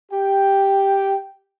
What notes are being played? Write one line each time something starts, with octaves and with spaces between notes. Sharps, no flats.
G4 G5